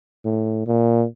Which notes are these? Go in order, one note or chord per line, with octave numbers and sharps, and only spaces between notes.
A2
A#2